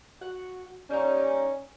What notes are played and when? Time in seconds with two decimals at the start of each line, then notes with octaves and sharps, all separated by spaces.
0.21 F#4 F#5
0.90 G3 A#3 C#4 D#4